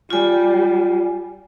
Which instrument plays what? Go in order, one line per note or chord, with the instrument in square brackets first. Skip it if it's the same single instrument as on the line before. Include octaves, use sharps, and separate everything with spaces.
[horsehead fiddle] G3 [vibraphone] F4 G#5